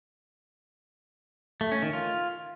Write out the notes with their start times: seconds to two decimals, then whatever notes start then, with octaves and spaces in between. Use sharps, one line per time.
1.61 A3
1.72 C#4
1.82 D#3
1.93 F4